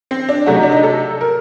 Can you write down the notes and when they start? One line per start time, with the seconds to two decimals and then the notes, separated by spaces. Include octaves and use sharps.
0.11 C4
0.29 D4
0.46 C3 F#3 A3 F#4
0.55 D#4
0.63 D4
0.72 D#4
0.83 A4
1.21 A#4